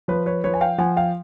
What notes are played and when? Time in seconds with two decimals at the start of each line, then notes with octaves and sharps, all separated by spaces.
0.08 F3 B4 C#5
0.26 B4 C#5
0.44 F3 B4 C#5
0.54 G#5
0.61 F5 G5
0.78 F3 F#5 G#5
0.97 F5 G5